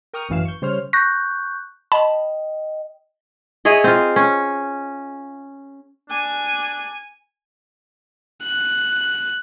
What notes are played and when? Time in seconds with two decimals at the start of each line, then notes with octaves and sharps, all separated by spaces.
0.13 A#4 G5 C#6 D#6 F6
0.29 A1 F#2 E3 F5 E7
0.45 C#6 G6
0.62 C#3 G3 C5 C#5 F6
0.93 C#6 F#6 G6 A#6
1.92 D#5 G5 A5 B5
3.65 E4 G#4 C#5 D#5
3.84 C4 F4
4.16 C#4
6.10 D4 G#5
8.43 F#6